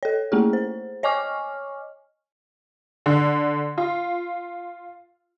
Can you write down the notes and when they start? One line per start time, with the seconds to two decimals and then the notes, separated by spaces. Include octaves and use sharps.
0.03 A4 C#5
0.32 A3 A#3 C#4 E4 G#4
0.53 C5
1.03 C#5 D#5 G#5 C#6 D6 F6
3.06 D3
3.78 F4